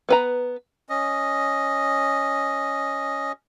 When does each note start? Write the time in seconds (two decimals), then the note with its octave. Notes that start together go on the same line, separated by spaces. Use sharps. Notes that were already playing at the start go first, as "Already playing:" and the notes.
0.09 B3 B4 A#5
0.89 C#4 D#5